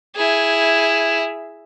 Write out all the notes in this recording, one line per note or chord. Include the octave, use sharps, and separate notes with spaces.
E4 G#4